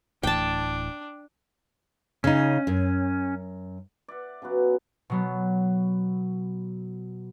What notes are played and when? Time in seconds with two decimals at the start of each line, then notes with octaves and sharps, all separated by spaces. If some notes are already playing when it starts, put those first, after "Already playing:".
0.23 D1 A2 E3 D4 G5 A5
2.24 C#3 C#4 D#4
2.67 F#2
4.08 D5 E5 F#5
4.42 C#3 F#3 B3 F#4
5.10 B2 F#3 B3